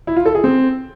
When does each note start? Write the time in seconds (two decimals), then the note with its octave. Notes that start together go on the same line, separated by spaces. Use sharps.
0.07 E4
0.16 F4
0.26 A4
0.35 G#4
0.44 C4